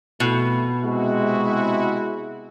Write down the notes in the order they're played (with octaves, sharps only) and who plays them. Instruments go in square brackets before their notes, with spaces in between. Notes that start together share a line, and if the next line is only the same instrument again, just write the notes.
[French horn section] F2 A3 E4 [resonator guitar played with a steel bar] B2
[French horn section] C3 G#3 [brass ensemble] E4 F#4